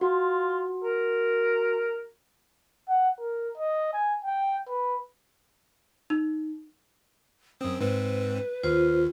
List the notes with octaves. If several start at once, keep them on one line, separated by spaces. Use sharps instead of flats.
F4 F#4
A#4
F#5
A#4
D#5
G#5
G5
B4
D#4
F#2 C4 D#6
G#2 C4 B4
D#2 F4 C5